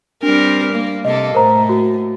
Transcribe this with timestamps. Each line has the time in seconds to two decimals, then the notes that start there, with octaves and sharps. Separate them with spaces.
0.23 G3 C4 D4 A#4
0.73 A#3
1.05 C3 A#3 A4 D#5
1.35 A2 A#4 C5 A#5
1.69 F#4